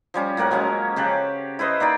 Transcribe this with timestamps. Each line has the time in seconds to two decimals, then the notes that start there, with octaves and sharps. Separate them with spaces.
0.14 F3 G3 C#4
0.37 A2 A#3 A#4 F#5
0.51 F3 F#3 G#3 C#4
0.96 C#3 G4 F#5 A5
1.59 E4 B4 C5 D#5
1.80 A#3 D#4 D5 G5